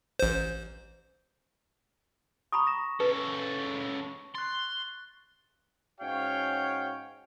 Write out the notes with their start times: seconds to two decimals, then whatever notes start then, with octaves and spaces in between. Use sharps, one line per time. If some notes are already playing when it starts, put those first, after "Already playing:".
0.19 A1 C5
2.52 A#5 B5 C#6 D#6
2.67 A#6 E7
3.00 C#3 A4 B4
4.35 C6 F#6 A6
6.01 G#2 C#4 F#4 C#5 F5 G5